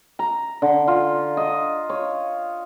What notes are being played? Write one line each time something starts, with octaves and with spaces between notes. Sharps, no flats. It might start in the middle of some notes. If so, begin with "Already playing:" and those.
A#5
D3
F4
D#5
C#5